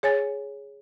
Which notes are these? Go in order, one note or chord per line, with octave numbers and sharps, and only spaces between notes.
G#4 C#5 G#5 A6